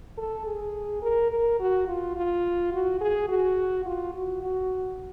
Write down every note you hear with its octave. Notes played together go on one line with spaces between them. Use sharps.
A4
G#4
A#4
A#4
F#4
F4
F4
F#4
G#4
F#4
F4
F#4
F#4